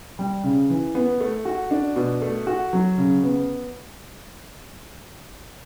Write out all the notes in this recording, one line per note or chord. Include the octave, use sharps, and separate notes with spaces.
G3
C#3
E3
B3
A3
F#4
D4
B2
A3
F#4
F#3
C#3
B3